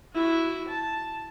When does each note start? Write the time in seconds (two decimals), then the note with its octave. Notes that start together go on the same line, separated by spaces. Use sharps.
0.13 E4 F#4
0.68 A5